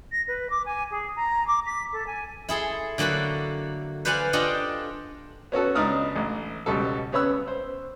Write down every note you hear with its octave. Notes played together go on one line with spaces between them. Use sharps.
A#6
B4
D6
G#5
G#4
A#5
D6
B6
A4
G#5
E4 G#4 A4 C6
D3 F#3 A#3 F#4 A4 B5
B4 C5 D5 F5 F#5 G#5
D4 F4 G4 A4 D5 D#5
B3 C#4 F#4 A4
C#2 D4 D#4 D#6 F6
A1
C#2 B2 G3 A4
C#3 B3 C#5 B5 E6 F#6
C5